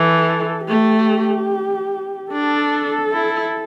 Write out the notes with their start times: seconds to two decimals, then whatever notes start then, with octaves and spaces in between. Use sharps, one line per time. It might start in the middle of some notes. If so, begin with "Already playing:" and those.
Already playing: E3 A4
0.68 A3 G4
2.32 D4 A4
3.12 E4